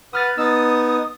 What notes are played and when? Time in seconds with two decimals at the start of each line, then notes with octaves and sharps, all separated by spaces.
0.13 B4 F#5 D#6 F6 A6
0.38 B3 D#4 D#6 E6 A6